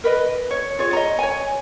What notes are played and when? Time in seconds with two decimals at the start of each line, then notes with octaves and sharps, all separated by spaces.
0.04 A#4 B4 D#5
0.51 C#5
0.79 F4 G#4 C#5
0.93 D#5 A#5
1.19 C#5 G#5